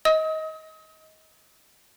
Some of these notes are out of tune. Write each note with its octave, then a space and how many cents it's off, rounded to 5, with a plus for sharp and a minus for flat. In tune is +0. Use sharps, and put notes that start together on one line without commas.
D#5 +20 D#6 +35